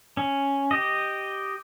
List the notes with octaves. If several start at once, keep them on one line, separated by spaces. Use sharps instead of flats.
C#4
G4 D#5